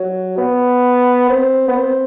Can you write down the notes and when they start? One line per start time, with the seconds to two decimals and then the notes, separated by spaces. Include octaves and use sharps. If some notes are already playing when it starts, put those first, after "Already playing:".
Already playing: F#3
0.38 B3
1.30 C4
1.68 B3
1.76 C4